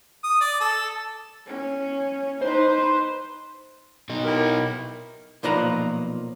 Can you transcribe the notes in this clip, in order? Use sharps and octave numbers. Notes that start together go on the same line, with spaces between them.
D#6
D5
A4
C#4
D#4 B4 C5
B2 D#4
E4 G4 A#4
B1 A#2 F3 B4 A#5